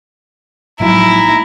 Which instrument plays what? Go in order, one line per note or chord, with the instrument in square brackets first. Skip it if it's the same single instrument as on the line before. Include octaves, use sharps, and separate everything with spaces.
[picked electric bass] A2 F3 F#3 [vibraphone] G#3 A#3 D#4 [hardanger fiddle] E4 [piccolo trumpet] A#5